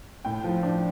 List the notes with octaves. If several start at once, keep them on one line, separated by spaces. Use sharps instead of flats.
A2 G5
F3
D4